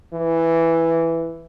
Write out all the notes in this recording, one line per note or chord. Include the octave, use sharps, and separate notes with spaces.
E3